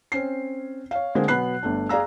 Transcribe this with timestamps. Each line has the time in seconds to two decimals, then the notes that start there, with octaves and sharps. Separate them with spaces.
0.12 C4 C#4 C7
0.91 C#5 F5
1.15 D3 G#3 A#3 C4 G#4
1.28 B2 F#3 B3 B5 F#6 C7
1.63 G1 A3 D4
1.89 G#4 D5 F5 A#5 E6